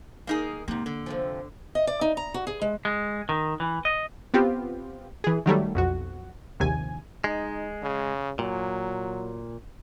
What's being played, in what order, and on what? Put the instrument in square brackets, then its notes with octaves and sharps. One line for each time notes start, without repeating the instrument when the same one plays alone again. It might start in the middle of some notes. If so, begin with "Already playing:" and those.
[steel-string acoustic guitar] D#3 [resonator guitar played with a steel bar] A#3 D#4 G#4
[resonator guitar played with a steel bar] G#2 C3 [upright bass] A#3
[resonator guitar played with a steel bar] D3
[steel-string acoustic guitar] F2 C3 F3
D#5
D5
D#4
A#5
F#4
G#4
G#3
[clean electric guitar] G#3
D#3
E3
D#5
[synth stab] B3 C4 F4 G4
E3 G#4
D#3 F#3 G3 A3
B1 F2 F#4
A#1 D#2 C3 G#5
[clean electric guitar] G#3 [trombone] D#4
[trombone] C#3
[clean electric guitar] A#2 [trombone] F#3